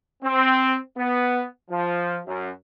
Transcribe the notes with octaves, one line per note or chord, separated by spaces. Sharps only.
C4
B3
F3
F#2